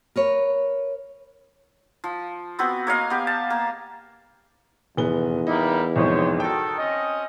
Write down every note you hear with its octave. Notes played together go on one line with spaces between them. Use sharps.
A#4 B4 C#5
F3
B3 C4 F#4 B4
A#3 C#5 D#5 F5
B3 G4
A5
A#3
F1 E2 B3 G7
G3 A#3 D#4 E4
C2 F2 G#2 C5 C#5
D#3 F#4 A4 G5
C4 C#4 D#5